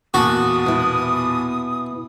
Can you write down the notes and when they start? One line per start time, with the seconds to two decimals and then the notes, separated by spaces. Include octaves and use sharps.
0.14 E2 A#2 F#4 A5 D#6
0.66 B2 E4